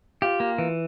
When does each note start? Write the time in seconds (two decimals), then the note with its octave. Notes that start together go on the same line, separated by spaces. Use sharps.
0.22 F4 G4
0.40 A#3
0.58 E3